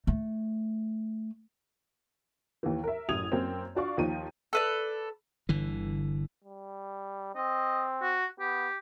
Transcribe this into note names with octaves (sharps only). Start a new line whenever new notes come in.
A3
D#2 E3
A#4 E5
A1 F#2 D#6 G#6 F7
F#2 A#3 C4
D4 F4 F#4 D5 F5 C#6
D#2 F3 D#4 D#7
A4 B4 D5
G1 D3 E3
G3
C4 D#5
F#4
B3 G4